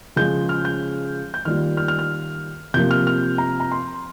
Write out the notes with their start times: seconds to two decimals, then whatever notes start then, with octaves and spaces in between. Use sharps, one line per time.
0.16 C#3 F3 G#3 C#4 G6
0.49 F6
0.65 G6
1.34 G6
1.45 D#3 G3 A#3 F4 F6
1.77 F6
1.88 F6
1.99 F6
2.74 C3 F3 A#3 G6
2.91 F6
3.07 F6
3.38 A#5
3.60 A#5
3.72 C6